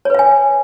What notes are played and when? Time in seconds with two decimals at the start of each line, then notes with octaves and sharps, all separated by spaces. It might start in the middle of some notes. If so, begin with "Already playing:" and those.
0.05 C#5
0.10 B4
0.14 F5
0.19 G#5